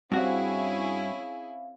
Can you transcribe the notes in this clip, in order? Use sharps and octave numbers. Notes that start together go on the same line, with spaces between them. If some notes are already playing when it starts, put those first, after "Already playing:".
G2 C4 C#4 E4 F#4 G#4 E5 F5